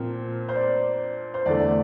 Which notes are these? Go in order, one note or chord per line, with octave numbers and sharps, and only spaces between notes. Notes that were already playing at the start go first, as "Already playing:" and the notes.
Already playing: A#2 F3 C4 A#4
C5
D5
C5
E2 D3 A3 D5